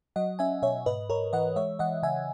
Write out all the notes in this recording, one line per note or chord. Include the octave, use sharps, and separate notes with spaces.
F#3 D#5 F#5
C#4 E5 G#5
B2 C#5 E5
G#2 B4 D#5
G#2 A#4 C#5
E3 D#5 F#5
G#3 C#5 E5
E3 D#5 F#5
C#3 E5 G#5